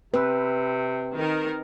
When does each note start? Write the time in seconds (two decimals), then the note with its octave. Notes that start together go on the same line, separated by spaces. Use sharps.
0.14 C3 C4 B4 E6
1.16 D#3 A#4